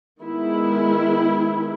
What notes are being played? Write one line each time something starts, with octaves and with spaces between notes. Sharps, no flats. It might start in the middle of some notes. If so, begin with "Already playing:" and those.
D#3 G#3 B3 E4